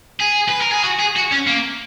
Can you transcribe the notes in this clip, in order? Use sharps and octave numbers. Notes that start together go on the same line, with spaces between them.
G#4
B4
A#4
G#4
F#4
G#4
F#4
C#4
A#3